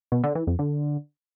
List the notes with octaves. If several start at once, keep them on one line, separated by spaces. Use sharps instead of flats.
B2
D3
E3
F2
D3